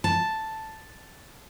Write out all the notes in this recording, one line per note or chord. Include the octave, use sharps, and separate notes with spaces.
A5